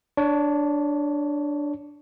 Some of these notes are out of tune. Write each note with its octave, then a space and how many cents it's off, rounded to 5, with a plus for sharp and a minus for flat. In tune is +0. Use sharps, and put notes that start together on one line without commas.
D4 +0 C#5 +20